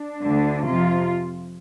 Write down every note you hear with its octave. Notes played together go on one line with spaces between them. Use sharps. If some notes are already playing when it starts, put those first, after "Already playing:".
Already playing: D4
D2 D3
F2 C3 F3 F4